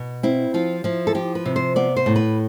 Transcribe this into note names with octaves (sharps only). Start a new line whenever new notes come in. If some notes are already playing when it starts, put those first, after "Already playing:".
Already playing: B2
C4 E4
F3 F4
F3 E4
A4
F3 G4
B4
C3
C5
B3 D5
C5
A2
B4